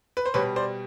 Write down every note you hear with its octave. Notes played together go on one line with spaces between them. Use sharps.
B4
C5
B2 G3 B4 C#5
C5 D5